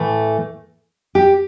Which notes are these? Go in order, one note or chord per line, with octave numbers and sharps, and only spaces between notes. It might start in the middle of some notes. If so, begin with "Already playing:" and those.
Already playing: A2 E3 A3
G4